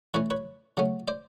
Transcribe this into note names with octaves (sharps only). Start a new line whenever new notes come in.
E3 A3 C#4 B4 C#5
B4 C#5
C#3 F#3 A3 C#4
C5 D5